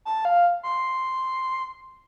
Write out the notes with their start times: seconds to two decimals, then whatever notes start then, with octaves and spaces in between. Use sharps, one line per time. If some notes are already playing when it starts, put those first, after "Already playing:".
0.05 A5
0.25 F5
0.63 C6